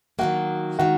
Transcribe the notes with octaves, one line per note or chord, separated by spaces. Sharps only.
D#3 F#3 A#3 F#4
D#3 G#3 F#4